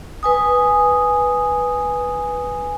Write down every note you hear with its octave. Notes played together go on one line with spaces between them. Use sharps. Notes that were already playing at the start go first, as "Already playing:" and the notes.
B4 G#5 D#6